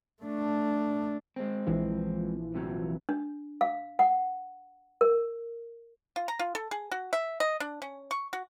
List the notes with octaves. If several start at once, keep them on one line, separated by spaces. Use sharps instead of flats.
A3 D4
G#3 C4
A#1 E3 F3
F2 C3 F#3
D4
F5
F#5
A#4
F4
A#5
F4
A4
G#4
F#4
E5
D#5
D4
C#4
C#6
F#4